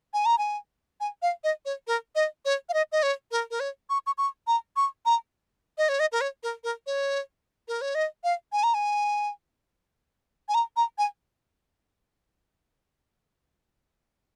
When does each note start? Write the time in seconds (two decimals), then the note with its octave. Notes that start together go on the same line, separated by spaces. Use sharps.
0.14 G#5
0.26 A#5
0.38 G#5
1.00 G#5
1.22 F5
1.44 D#5
1.65 C#5
1.87 A#4
2.15 D#5
2.45 C#5
2.69 F5
2.74 D#5
2.92 D#5
3.03 C#5
3.31 A#4
3.51 A#4
3.60 C#5
3.90 C#6
4.06 C#6
4.18 C#6
4.47 A#5
4.76 C#6
5.06 A#5
5.78 D#5
5.89 C#5
6.00 D#5
6.12 A#4
6.21 C#5
6.43 A#4
6.64 A#4
6.87 C#5
7.68 A#4
7.81 C#5
7.95 D#5
8.24 F5
8.52 G#5
8.63 A#5
8.74 G#5
10.49 G#5
10.54 A#5
10.77 A#5
10.98 G#5